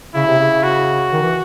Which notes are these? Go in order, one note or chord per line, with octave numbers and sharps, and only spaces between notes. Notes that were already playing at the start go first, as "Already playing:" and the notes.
C#3 E4
C3
C#3
F#4
D#3
E3